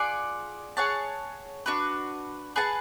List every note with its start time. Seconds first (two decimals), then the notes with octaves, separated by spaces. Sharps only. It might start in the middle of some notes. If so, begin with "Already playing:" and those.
Already playing: F4 G#4 D5 F#5
0.77 G#4 C#5 F#5 A5
1.66 D4 F#4 B4
2.56 G#4 B4 F#5 A5